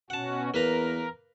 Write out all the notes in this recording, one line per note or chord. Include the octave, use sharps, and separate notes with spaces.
B2 C#4 F#4 F#5 A5
E2 A#3 A#4 B4 A#5